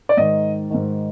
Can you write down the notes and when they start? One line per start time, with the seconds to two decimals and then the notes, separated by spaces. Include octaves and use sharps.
0.09 D5
0.17 G#2 D#3 D#5
0.70 G#2 D#3